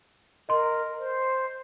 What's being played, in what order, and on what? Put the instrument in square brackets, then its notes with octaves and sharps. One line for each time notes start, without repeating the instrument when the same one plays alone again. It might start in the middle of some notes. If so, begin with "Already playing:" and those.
[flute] A#4 [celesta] D#5 C6
[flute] C5